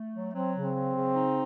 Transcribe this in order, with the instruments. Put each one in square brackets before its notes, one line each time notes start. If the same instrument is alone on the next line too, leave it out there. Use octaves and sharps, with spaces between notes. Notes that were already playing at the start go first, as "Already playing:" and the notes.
Already playing: [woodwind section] A3
F#3
[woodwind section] F#3 [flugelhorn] C4
[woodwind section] C#3
[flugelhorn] C4
[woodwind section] F#3
C#3
D#4